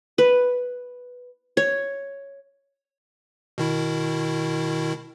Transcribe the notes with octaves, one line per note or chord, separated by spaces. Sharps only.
B4
C#5
B2 D#3 E4